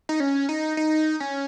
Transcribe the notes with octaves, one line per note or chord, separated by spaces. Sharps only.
D#4
C#4
D#4
D#4
C#4